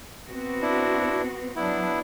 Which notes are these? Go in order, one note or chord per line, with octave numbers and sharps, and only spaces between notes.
B3 C4 F#4
D4 E4
F#3 B3 D4 E4